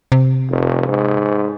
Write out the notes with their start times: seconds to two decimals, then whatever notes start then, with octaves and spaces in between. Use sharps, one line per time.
0.12 C3
0.50 F1
0.88 G#2